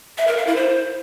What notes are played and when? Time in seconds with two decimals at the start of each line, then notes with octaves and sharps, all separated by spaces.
0.18 E5
0.27 A#4
0.37 F5
0.47 E4
0.56 C5